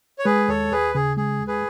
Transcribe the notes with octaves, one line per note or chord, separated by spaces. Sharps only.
C#5
G#3 G#4 B4
D#2 A4 C#5
D#2 G#4 B4
C#3 G#4
G#3 G#4
D#2
G#4 B4